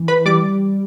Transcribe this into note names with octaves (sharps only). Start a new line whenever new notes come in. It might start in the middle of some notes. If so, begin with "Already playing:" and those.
Already playing: E3
B4 B5
G3 D5 D6